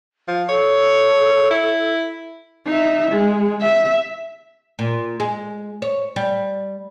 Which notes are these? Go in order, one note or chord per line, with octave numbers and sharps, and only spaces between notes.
F3
A4 C#5
E4
D#4 E5
G#3
E5
A#2
G#3
C#5
G3